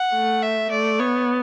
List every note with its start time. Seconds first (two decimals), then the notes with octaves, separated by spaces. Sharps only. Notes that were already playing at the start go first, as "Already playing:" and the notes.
Already playing: F#5
0.14 A3
0.42 E5
0.71 A3 D5
0.99 B3 C#5